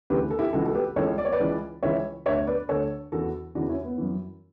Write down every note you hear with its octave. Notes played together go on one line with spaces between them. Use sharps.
D2 C#3 E3 G4 B4
A4
E4 G4
C#2 C#3 E3 F#4 A4
A4
G4 B4
C#2 C#3 E3 A4 C#5
D5
C#5
B4 D5
C#2 C#3 E3
C#2 C#3 E3 C#5 E5
D2 D3 C#5 E5
B4 D5
D2 D3 A4 C#5
E2 C#3 E3 F#4 A4
E2 C#3 E3 D4 F#4
C#4 E4
B3
F#2 E3